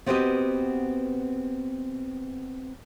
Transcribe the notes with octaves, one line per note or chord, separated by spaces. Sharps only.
B3 C4 F#4 G4 B4 D#5